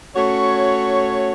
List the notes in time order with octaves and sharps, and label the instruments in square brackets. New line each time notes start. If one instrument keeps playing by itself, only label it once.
[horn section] A3 C#4 F#4 C#5